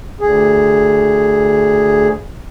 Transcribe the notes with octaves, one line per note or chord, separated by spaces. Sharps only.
D2 G#4